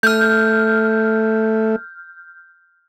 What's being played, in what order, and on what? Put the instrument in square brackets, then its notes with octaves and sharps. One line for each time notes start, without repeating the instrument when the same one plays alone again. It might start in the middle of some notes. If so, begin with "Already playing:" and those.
[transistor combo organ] A3 [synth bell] F6 G6